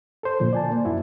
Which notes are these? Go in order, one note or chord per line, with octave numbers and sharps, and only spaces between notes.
A4 C5
A#2 D3 F3
D5 G#5 A5
A#3
F#2 E4 F#4